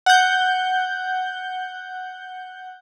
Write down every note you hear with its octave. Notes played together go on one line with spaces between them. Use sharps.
F#5 G6